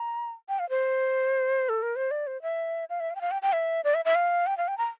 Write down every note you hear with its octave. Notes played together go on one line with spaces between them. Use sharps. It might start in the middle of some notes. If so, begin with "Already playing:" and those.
Already playing: A#5
G5
F5
C5
A4
A#4
C5
D5
C5
E5
F5
E5
F5
G5
F5
G5
G5
E5
D5
E5
E5
F5
G5
F5
G5
A#5